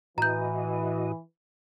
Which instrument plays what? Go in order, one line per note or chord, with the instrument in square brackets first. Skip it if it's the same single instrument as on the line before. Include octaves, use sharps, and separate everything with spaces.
[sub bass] A2 [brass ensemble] E3 [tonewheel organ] F#4 D#5 [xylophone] A#5 G6